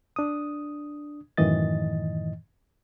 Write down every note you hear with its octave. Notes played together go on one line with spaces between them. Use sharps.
D4 D#6
F#2 A2 D#3 E3 D#5 A6